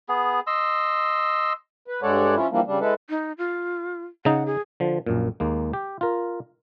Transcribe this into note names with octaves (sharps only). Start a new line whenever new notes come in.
B3 G#4
D#5 C6 E6
B4
G2 G#3 A4 C#5 D5 F#5
F3 C#4 E4 F4
E3 F3 G3 A#3 D4
C#3 G3 D4
G#3 E4 A4 B4
D#4
F4
C#3 D#4 F#5
G#4
D3 F3
A#1 F#2 A#2
D#2 G#3 A#3
G4
F4 A#4